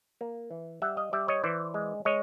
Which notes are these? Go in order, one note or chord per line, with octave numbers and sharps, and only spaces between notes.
A#3
E3
G3 E5 F#5
D#5 F5
G3 D5 E5
C#5 D#5
E3 C5 D5
G#3
G#3 C#5 D#5